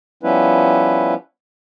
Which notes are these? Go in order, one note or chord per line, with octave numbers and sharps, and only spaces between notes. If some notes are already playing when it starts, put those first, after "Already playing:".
F3 G3 B3 C#4 E4 B4